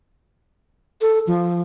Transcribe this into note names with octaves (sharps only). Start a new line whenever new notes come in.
A4
F3